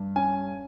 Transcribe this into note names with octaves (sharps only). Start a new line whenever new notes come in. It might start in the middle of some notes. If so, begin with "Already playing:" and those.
Already playing: G2
C#4 G#5